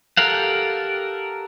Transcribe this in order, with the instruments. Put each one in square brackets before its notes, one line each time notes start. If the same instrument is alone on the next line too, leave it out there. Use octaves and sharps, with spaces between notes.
[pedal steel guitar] G4 A4 A#4 F5 F#5